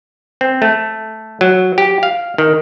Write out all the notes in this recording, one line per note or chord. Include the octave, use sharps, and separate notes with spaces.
C4
A3
F#3
G4
F5
D#3